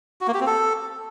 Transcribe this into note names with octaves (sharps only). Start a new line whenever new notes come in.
F#4
A#3
G4
C4
A4